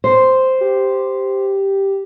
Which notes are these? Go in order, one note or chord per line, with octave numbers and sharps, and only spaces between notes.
C5
G4